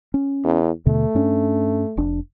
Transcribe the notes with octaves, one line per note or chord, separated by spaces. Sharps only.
C#4
E2
D#2 B2 D3 A3
G2 C#4 D4
F1 D4